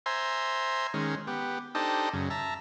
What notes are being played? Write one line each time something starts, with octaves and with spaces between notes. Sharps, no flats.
C5 E5 G#5 A#5 C6
D#3 G#3 C#4
B3 G4
D4 D#4 G4 A4 C5 D#5
F#2 C#3
E5 A5 A#5